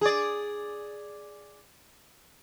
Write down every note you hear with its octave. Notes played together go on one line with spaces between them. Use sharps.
G#4 D5